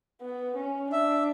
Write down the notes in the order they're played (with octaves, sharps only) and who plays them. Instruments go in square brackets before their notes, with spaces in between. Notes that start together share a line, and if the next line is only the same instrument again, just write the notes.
[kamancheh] B3
C#4
[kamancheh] D4 [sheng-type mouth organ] E5